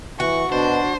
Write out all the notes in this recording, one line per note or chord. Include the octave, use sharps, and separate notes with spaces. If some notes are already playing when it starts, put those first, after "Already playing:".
E3 F#4 C#6
B2 D4 C5